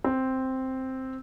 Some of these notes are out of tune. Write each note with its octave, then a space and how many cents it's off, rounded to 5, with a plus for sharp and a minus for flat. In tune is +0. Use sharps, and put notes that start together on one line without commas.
C4 +0